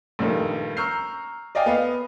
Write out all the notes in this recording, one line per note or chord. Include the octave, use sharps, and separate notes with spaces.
A#1 G2 D#3 A3
A#5 C#6 E6 F6 G6 C7
D5 D#5 F5 G5 G#5
B3 D#5 F5